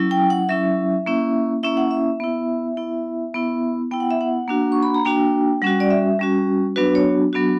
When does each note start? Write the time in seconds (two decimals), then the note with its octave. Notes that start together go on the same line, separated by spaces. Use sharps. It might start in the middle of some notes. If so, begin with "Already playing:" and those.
Already playing: F#3 C#4 E4
0.11 G5
0.30 F#5
0.49 F#3 C#4 E4 E5
1.06 A#3 C#4 E4
1.63 A#3 C#4 E4 E5
1.77 F#5
1.91 E5
2.20 B3 E4
2.77 B3 E4
3.34 B3 E4
3.91 B3 E4 G5
4.00 F#5
4.11 E5
4.21 F#5
4.48 A#3 D4 F#4
4.72 C#6
4.83 B5
4.94 A#5
5.05 A#3 D4 F#4 G5
5.62 G3 C#4 F#4 F#5
5.80 D5
5.90 E5
6.19 G3 C#4 F#4
6.76 F#3 B3 D4 F#4 B4
6.95 C#5
7.33 F#3 B3 D4 F#4